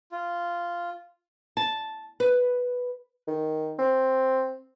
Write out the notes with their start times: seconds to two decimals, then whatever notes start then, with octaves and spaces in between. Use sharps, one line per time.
0.12 F4
1.57 A5
2.20 B4
3.28 D#3
3.79 C4